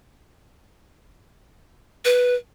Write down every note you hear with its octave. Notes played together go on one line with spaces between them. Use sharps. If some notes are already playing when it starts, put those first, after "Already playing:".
B4